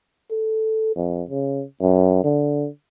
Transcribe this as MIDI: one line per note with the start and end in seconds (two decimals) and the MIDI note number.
0.31 0.91 69
0.96 1.23 41
1.30 1.64 49
1.82 2.22 42
2.24 2.68 50